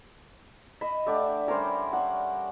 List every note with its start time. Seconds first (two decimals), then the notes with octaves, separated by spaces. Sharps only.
0.81 D#5 E5 B5
1.06 A3 D4 G4 D5 E5 F#5
1.48 G3 C#4 A#4 C5
1.93 F#5 C#6